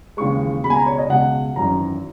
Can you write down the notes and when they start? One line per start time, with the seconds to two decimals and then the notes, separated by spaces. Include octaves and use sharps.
0.17 D#2 C#3 E3 G#3 C#6
0.64 C#2 B2 G#3 B5
0.70 G#5
0.75 A#5
0.86 C#5
0.98 D#5
1.09 C#2 B2 G#3 F#5
1.56 G#1 F#2 E3 A#5